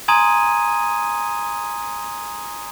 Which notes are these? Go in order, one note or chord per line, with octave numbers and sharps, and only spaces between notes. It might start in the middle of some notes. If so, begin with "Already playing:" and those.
G#5 A#5 C6 D#6 G#6 D#7